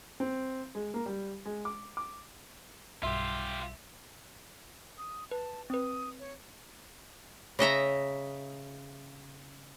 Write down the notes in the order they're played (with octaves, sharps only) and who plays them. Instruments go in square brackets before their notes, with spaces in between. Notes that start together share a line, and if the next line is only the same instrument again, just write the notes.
[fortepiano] C4
G#3
A#3
G3
G#3
D6
D6
[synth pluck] B1 G2 [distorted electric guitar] F4 G4 [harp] E5 C6
[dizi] D#6
[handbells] B4 [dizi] A5
[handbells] C4 B4 [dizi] D#6
[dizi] C#5
[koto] C#3 D#5 E5 A#5